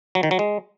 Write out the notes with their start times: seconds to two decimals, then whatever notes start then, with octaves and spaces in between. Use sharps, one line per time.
0.15 F#3
0.23 D#3
0.31 F#3
0.39 G#3